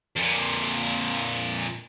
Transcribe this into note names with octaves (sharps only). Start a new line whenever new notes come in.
F2 A#2